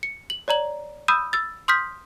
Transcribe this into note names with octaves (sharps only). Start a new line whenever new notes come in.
C#7
F#7
C#5 D5 A#5 F#7
B5 D#6 E6 G6 D#7
E6 A6
C6 D#6 F6 G6 B6